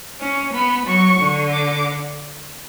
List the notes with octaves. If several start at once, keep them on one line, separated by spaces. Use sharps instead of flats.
C#4
B3 B5
F#3 C#6
D3
D6